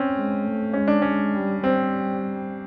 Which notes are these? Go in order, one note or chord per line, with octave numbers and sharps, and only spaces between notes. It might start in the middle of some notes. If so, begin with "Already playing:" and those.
Already playing: C4 C#4
G#3
A3
G#3 C#4
D4
G#3 C#4
G3
G3 C4